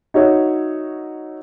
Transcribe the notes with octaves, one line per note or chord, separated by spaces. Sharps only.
D#4 F#4 C#5 E5